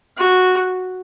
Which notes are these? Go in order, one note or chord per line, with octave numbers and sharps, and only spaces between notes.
F#4